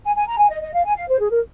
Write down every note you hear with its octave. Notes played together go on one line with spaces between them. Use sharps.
G#5
G#5
A#5
G#5
D#5
D#5
F5
G#5
F5
C5
G#4
A#4